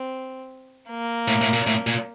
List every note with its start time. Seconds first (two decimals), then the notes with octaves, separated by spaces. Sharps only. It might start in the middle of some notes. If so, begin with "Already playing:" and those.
Already playing: C4
0.90 A#3
1.28 A2
1.41 A2
1.53 A#2
1.67 A2
1.87 A#2